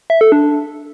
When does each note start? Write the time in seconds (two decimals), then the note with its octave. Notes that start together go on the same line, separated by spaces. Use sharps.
0.10 E5
0.21 A4
0.32 D4